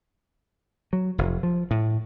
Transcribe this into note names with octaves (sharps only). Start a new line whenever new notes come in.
F#3
F1
F3
A2